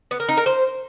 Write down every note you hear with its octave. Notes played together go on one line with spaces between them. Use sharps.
B3
A#4
D#4
A#4
C5